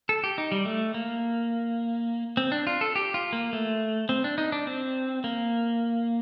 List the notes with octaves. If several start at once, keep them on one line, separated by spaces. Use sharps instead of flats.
A4
G4
D#4
G3
A3
A#3
C4
D4
F4
A4
G4
F4
A#3
A3
C4
D4
D#4
D4
C4
A#3